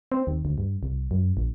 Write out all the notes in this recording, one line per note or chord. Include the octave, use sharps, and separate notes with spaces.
C4
D#2
D2
G2
C2
F#2
A#1